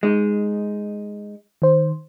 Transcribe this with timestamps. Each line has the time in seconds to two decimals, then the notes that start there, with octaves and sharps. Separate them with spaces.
0.03 G#3 D#4
1.62 D#3 C5